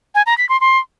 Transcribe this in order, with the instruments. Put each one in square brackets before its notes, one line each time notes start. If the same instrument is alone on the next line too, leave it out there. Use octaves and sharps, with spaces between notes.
[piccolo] G#5
A#5
B6
C6
C6